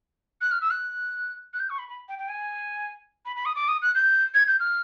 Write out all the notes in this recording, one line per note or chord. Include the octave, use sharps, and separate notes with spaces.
F#6
F6
E6
F#6
F#6
G6
C#6
B5
B5
G5
G5
G#5
B5
B5
D#6
D6
D#6
F#6
G6
G#6
G6
F6